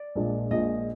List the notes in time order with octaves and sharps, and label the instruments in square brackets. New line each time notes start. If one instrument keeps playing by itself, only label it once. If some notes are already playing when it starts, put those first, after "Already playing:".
Already playing: [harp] D5
[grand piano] A#1 A#2 G#3 D4
[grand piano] A#1 A#2 G#3 D4 [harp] D#5